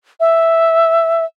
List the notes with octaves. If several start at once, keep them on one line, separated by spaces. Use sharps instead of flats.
E5